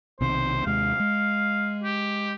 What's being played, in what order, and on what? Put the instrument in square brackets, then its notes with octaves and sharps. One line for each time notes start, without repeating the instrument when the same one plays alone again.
[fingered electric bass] B1 C3 D#3 [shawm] C5
[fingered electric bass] D#2 C3 G#3 [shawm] F5
[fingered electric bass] G#3
[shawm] G4